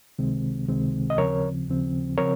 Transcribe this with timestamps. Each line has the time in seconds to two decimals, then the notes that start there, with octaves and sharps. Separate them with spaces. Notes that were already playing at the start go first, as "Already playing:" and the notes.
0.19 C#2 C3 D#3 G#3 C4
0.68 C#2 C3 D#3 G#3 C4
1.10 D#5
1.18 D#2 C#3 F3 C4 A#4 C#5
1.68 D#2 C#3 F3 C4
2.18 C#3 F3 C4 A#4 C#5